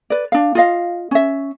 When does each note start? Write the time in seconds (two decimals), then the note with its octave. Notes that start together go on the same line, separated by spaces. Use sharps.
0.10 B4 D5
0.32 D4 F5
0.55 F4 D#5 F5
1.11 C#4 E5